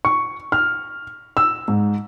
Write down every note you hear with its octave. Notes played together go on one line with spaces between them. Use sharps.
C#6
F6
E6
G#2